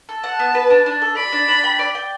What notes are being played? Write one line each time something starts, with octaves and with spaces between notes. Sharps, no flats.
A4
F#5 A5
B3
B4
D4
D4
A4
D5 B5
D4
D4
G5
D5
G5